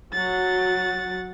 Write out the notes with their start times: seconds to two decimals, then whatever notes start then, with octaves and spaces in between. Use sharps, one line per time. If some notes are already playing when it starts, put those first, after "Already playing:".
0.13 F#3 F#5 A6